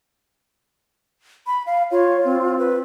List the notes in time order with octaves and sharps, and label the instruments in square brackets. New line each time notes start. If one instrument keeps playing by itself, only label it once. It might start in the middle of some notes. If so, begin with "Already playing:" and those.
[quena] B5
F5
[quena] F4 [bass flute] C#5
[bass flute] C4
[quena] B4